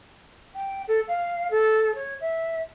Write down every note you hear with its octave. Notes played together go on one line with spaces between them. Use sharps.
G5
A4
F5
A4
C#5
E5